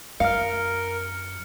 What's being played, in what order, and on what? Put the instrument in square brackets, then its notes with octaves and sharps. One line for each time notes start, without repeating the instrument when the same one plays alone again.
[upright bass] F#2 [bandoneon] A#4 [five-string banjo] F5 [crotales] F6 C#7